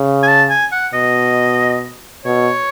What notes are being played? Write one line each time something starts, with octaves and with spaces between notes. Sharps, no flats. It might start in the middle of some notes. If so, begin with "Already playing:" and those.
Already playing: C#3
G#5
A5
G#5
F#5
B2 D#5
B2 C#5